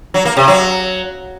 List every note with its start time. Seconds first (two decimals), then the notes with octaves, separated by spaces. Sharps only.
0.14 F#3
0.25 A#3
0.37 C3
0.48 F#3